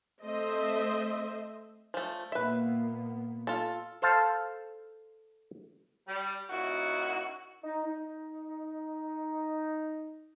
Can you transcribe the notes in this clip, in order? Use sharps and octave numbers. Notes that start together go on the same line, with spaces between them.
A3 C4 C5 D#5 E5
F3 A3
A#2 A#3 B3 B4 E5
F4 A4
A4 C5 F5 A5
G3
A#2 C#3 D#4 E4 F#4
D#4
D#4